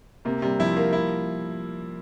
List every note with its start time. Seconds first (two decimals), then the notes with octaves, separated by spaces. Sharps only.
0.25 C3 A#3
0.42 C3 G3
0.59 F3 E4
0.77 A#3
0.93 E4